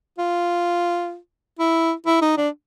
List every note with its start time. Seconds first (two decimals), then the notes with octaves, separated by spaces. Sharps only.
0.18 F4
1.59 E4
2.06 E4
2.22 D#4
2.37 D4